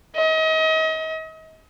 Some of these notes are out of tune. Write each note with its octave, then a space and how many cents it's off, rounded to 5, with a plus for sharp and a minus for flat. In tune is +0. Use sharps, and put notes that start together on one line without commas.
D#5 +35